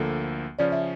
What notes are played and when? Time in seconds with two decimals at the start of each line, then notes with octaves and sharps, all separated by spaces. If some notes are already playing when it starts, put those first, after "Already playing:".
Already playing: D2 D3 F3 A#3 A4
0.59 C#3 F3 C#4 D5
0.72 E5